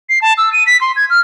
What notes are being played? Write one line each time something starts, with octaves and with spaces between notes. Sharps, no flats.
C7
A5
E6
D#7
B6
C6
G#6
F6